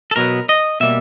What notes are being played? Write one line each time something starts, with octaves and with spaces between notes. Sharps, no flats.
A4
B2 F#3 B3 A#4
D#5
B2 G3 A#3 E5